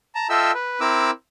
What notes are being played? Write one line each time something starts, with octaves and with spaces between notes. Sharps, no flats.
A5 A#5
F4 A4 D#5 E5 G5 E6
B4
C4 E4 A#4 D6 E6